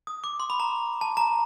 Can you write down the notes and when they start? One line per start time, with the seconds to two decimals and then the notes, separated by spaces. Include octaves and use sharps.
0.07 D#6
0.24 D6
0.40 C6
0.50 B5
0.60 A#5
1.01 A5
1.17 A#5